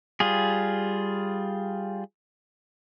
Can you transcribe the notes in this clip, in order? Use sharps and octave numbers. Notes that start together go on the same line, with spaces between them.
G3 F4 G#4